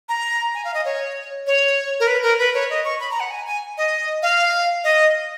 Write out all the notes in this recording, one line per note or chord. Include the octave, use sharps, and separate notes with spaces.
A#5
G#5
F5
D#5
C#5
C#5
A#4
B4
A#4
B4
C#5
D#5
C#6
B5
A#5
F#5
G#5
G#5
D#5
F5
D#5